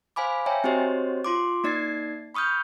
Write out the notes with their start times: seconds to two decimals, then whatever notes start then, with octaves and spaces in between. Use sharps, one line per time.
0.16 C5 F5 G#5 B5 D6
0.46 C#5 E5 G5 G#5 A#5
0.64 C4 F#4 G4 C5 C#5 D#5
1.24 F4 C6 D6
1.64 A#3 D#4 D5 G#6 A6 C7
2.35 B5 C#6 D#6 F6 G6